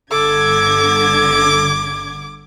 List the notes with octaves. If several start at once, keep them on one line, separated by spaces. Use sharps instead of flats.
G1 D3 A4 D6 G#6